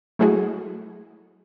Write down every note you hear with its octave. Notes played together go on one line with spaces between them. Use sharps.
F#3 G#3 A3 E4 F#4 G#4